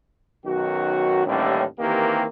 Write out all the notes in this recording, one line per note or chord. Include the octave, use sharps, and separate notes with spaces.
B1 F#2 D#3 F#4
A1 D#2 A2 D3 G3 C#4
D#3 E3 A#3 C4 G4